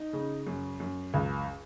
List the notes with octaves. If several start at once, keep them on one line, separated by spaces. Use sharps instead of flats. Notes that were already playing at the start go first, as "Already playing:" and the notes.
Already playing: D#4
C#3
F#2
F#2
C#2